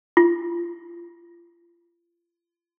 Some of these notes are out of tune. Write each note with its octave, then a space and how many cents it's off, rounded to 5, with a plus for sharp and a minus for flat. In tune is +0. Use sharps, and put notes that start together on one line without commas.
F4 -35